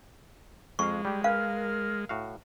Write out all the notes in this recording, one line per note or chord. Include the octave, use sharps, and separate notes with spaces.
F2 G#3 F5 C#6
G3 G4
A#4 B4 F5 G#5 F6
A2 F#4 F5